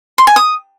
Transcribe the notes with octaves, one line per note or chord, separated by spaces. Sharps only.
C6
G#5
D#6